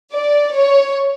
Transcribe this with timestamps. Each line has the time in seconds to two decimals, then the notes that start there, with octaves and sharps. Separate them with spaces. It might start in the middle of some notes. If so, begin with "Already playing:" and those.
0.15 D5
0.55 C#5